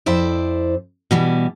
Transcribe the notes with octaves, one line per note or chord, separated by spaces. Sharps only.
F2 E4 C5 D5
B2 E3 G3